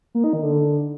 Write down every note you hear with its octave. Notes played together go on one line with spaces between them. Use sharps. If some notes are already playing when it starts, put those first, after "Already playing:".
A#3
D#4
D#3
D3